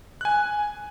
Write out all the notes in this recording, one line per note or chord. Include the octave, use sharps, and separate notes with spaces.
G#5 F#6